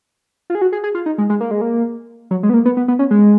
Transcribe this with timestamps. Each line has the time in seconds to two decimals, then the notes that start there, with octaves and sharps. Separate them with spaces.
0.50 F4
0.55 G#4
0.62 F#4
0.72 G#4
0.84 G#4
0.95 F4
1.06 D#4
1.18 G#3
1.30 G#3
1.41 A#3
1.51 G#3
1.61 A#3
2.31 F#3
2.43 G#3
2.50 B3
2.54 A#3
2.65 B3
2.77 B3
2.88 B3
2.99 C#4
3.11 G#3